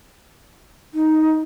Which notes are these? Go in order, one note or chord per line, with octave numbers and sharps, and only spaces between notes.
D#4